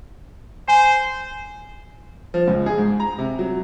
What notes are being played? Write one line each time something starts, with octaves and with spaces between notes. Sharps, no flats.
C5 G#5
F3
C#2
G#4
G#2
A#5
C3
F#3